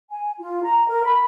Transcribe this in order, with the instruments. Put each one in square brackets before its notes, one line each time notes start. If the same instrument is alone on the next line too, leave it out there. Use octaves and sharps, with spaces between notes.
[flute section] G#5
F4
A#5
A#4
B5